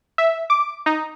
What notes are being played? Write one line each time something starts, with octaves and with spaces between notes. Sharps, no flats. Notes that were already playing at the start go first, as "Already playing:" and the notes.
E5
D6
D#4